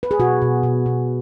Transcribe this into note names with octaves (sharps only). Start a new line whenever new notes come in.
B4
G#4
B2 F#4
B2
B2
B2